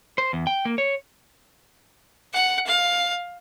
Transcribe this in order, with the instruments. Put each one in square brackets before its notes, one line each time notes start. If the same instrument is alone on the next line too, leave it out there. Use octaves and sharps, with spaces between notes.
[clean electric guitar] C5
E2
G5
A#3
C#5
[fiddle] F#5
F5